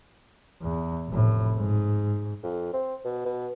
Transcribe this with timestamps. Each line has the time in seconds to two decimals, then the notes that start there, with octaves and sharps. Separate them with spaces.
0.62 E2
1.08 F1 A2
1.57 G#2
2.43 F2
2.73 C4
3.05 B2
3.26 B2